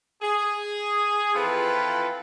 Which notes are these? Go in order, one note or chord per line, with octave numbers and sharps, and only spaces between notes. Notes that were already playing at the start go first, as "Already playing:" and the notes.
G#4
E3 F3 C4 F4 A4 B4